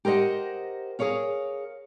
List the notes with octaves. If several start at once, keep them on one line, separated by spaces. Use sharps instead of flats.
G4 A#4 C5 D#5 F#5
G#4 A#4 C#5 F5